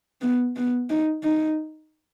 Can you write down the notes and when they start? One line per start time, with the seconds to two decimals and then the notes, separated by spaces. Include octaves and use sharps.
0.22 B3
0.56 B3
0.90 D#4
1.23 D#4